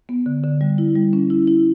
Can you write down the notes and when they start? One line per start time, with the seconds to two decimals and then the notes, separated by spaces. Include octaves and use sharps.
0.09 B3
0.26 D3
0.44 D3
0.61 G3
0.78 E4
0.95 G3
1.13 C#4
1.30 E4
1.47 E4